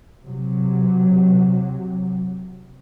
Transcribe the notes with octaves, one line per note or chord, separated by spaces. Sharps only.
C3 F#3